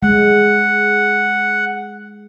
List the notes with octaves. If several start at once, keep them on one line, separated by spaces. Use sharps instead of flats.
G#3 F#5